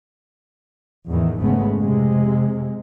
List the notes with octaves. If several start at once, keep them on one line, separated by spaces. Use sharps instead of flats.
E2 A2 D#3 E3
G#1 C#3 G#3 A3 B3
F2 C3 G#3